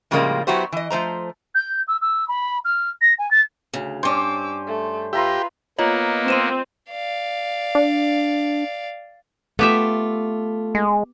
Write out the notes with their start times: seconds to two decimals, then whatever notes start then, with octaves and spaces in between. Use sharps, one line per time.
0.11 A2 C#3 F3 G3 G#3 A#3
0.47 F#3 B3 E4 F#4 G4 C5
0.72 E3 D#5
0.90 F3 A3 C5 A#5
1.55 G6
1.88 E6
2.02 E6
2.28 B5
2.65 F6
3.01 A#6
3.19 G#5
3.31 A6
3.73 D2 C#3
4.03 G2 C#4 C5 D5 D6 E6
4.67 A3
5.13 F4 G4 B4 E5 A#5 C6
5.79 A#3 B3 F4 C#5 D#5 A#5
6.28 C4 C6 D#7 E7
6.91 D5 F5
7.75 D4
9.59 A3 B3 F4 G4 E5
10.75 G#3